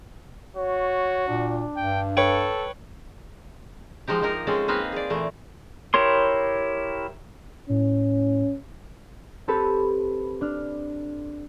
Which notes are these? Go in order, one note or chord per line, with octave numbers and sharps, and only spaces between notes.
F#4 C#5
A#2 D4
G2 G5
A4 B4 C#5 G5
F3 G#3 D#4 G4
F3 A#3 D#4 A#4
G#3 C4 C#4 G#4 A4
A#3 C4 D#4 B4 C5 F5
G#4 D5
A#2 E3 A3
E4 G4 A#4 C#5 C6
A2 C#4
C4 G4 A4 B4
D4 F6